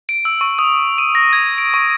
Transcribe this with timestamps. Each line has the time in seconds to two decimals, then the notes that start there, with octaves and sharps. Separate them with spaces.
0.09 D7
0.25 E6
0.41 C#6
0.59 D#6
0.98 D#7
1.15 A#6
1.33 G#6
1.58 D7
1.74 C#6